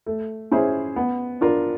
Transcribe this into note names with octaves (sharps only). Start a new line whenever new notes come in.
A3
C#4 E4 G#4 C5
B3
D4 F4 A#4